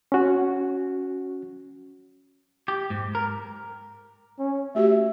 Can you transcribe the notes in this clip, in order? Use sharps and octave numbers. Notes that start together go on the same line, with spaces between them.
C#4 F#4
G4
G#2
A#4
C#4
A3 F#4 G4 E5